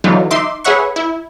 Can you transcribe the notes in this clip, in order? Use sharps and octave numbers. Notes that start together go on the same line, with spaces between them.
D3 E3 F#3 D#4 F4
D#4 E5 C6 D6
G#4 B4 C#5 E5 F#5 C#6
E4